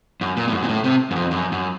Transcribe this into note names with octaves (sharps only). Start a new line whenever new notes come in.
F#2
A#2
A2
F#2
A#2
A2
C3
F#2
F2
F#2
F#2